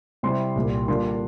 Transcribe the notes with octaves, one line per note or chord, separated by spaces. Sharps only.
C3 G3 C4 E4 C6
C2 A#2 G3
D3 G3 A#3 D4 F4 C6